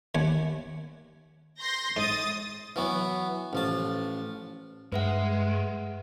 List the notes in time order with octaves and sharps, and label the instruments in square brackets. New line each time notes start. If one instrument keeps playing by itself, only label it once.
[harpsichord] D#2 F#5 G#5
[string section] C6 G6 A#6
[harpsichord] G#2 [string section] D#6 A6
[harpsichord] E3 F#3 B3
A1 F3 A5
[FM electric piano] G2 [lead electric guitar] G#3 [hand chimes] B4 E5 F#5